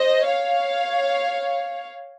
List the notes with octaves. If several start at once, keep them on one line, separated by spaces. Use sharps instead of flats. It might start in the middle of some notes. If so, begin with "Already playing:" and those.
Already playing: C5 D#5
C#5 F5